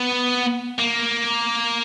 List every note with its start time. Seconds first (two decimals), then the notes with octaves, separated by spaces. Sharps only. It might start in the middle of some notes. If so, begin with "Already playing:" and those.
Already playing: B3
0.79 A#3